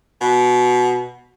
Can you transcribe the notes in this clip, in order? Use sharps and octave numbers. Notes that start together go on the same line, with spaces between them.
B2